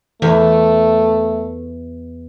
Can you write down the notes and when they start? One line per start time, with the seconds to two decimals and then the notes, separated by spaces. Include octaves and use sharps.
0.22 E2 A3